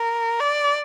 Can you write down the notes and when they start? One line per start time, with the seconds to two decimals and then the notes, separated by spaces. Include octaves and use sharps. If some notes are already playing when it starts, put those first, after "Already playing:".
Already playing: A#4
0.40 D5